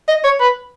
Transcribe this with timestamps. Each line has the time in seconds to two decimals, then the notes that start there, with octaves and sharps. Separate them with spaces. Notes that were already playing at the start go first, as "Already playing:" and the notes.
0.08 D#5
0.24 C#5
0.41 B4